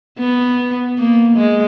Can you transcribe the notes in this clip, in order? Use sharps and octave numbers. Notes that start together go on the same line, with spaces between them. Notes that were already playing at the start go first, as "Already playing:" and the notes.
B3
A#3
G#3